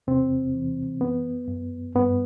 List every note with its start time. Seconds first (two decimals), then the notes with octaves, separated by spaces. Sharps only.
0.07 E2 C3 C4
0.54 E3
1.01 F#2 B3
1.48 F#2
1.95 G2 B3